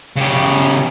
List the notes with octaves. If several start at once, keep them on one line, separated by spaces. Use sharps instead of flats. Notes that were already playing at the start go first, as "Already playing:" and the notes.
C#3 G4